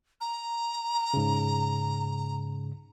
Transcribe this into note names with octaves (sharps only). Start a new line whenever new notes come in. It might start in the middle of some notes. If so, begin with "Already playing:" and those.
A#5
G#2 C#3